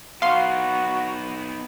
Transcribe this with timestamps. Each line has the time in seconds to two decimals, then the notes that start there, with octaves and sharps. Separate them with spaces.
0.22 B3 D#4 F#4 F5 C6